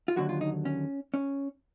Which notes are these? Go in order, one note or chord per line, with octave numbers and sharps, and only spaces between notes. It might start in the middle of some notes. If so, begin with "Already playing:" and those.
F4
D#2 D3 F#3 F#4
F4
D#4
C#4
C#4